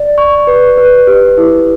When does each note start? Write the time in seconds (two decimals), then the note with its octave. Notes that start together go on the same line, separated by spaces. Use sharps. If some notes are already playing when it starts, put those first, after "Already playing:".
Already playing: D5
0.18 C#6
0.47 B4
0.78 B4
1.07 G4
1.38 E4